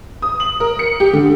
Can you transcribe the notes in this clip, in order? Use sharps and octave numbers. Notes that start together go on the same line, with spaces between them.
D#6
F#7
A#4
C#7
G4
D3